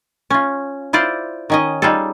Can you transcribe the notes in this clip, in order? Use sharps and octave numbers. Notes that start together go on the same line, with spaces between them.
C#4 F4
E4 F4 C5 D5
D#3 C#4 D#5
G3 D#4 F4 G#4 A4